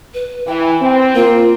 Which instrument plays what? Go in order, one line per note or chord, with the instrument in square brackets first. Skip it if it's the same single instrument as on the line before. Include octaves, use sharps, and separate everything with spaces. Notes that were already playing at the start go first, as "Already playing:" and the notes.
[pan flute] B4
[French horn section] E3 [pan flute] G5
[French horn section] C4
[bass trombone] A#3 [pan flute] F4